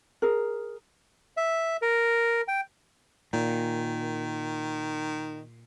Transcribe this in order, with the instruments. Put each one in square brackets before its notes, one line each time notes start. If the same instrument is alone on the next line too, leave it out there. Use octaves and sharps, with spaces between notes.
[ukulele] G#4 A#4
[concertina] E5
A#4
G5
[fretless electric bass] A#2 [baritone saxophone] D#3